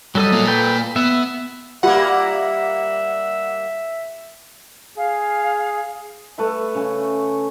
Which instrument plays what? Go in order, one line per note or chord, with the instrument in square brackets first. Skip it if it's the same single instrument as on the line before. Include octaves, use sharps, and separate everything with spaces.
[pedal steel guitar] F#3 A4 D#5 [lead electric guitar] G3
[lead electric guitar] A#3 F4
[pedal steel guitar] A4 B4 G5
[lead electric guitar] B3 [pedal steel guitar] E5
[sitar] G3 A#3 [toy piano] F4 G4 B4 [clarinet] E5 [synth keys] F#5
[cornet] G#4 [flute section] F5
[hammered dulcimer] A3 B4 E5
C#3 C#4